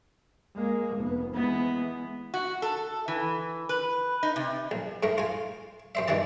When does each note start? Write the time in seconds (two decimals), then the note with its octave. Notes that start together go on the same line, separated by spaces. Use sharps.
0.55 G#3 A#3
0.96 F1 B3
1.34 E3 G#3 B3
2.34 F#4
2.62 A4
3.08 E3
3.69 B4
4.23 D#4
4.36 C3
4.71 A#1
5.03 G#2 A3 A#4
5.18 F4 G#5
5.95 F#2 C5 E5
6.08 G2 B2 D#3 E3 A5